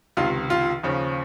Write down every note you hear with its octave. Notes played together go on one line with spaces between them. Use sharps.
C#2 C3 D#3 F4
F4
D#2 C#3 F3